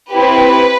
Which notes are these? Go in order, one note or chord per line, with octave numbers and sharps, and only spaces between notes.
C4 E4 G4 B4